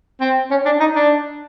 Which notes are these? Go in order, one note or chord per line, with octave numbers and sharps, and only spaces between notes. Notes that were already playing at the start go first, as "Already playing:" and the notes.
C4
C#4
D4
D#4
D4